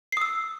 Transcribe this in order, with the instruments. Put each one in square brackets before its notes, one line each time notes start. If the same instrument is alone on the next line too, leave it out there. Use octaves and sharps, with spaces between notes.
[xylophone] C7
D#6
E6